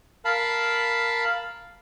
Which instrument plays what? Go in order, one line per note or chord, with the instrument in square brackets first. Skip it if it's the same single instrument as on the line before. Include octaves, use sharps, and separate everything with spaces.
[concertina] A#4 F5 A5 B5